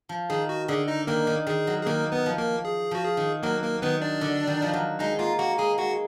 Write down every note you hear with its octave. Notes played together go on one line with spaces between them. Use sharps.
F3
D#3 G#4
F#4
D3 G#4
D#4 D#5
D#3 A#3 A#4
D#3
D#3 G#4
F#3
G#4
D#3 A#3 A#4
B3 B4
F3
A#3 A#4
G#4
F3 F#4
G#4
D#3
F#3 A#3 A#4
A#3 A#4
D#3 B3 B4
D4 D5
D3
D#3
F3
F#3
G#3 D#4 D#5
A#3 F4 F5
A#3 F#4 F#5
G#3 G#4 G#5
G#3 F#4 F#5